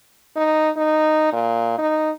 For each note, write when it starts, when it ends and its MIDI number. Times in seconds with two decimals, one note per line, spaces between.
0.36 0.70 63
0.77 1.29 63
1.32 1.77 46
1.78 2.11 63